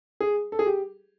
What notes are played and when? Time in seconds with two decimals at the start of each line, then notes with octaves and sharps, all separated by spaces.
0.20 G#4
0.52 A4
0.59 G#4
0.66 G4